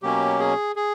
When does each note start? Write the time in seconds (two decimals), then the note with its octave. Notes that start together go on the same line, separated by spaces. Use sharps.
0.03 B2 F#3 A#3 C#4 G4
0.39 G#4
0.76 G#4